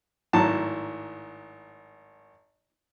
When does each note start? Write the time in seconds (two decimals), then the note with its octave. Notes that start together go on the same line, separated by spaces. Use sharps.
0.33 G#1 A2 F#3 A5 A#5